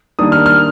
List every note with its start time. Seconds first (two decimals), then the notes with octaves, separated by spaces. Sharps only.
0.19 D#3 G3 A#3 D4 D#6
0.32 F6
0.46 F6